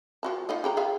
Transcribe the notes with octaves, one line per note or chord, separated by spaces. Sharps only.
F3 F#4 A5
D#4 F4 D#5
G#4 G5 A#5
G#4 E5 F5